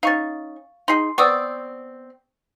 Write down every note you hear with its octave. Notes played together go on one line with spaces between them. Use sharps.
C#4 D#4 F5 C#6 A6
D#4 G#4 C6 C7
B3 C4 D5 C#6 D#6 E6